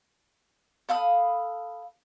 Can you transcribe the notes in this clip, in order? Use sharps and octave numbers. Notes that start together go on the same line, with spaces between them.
A4 F5 B5 D#6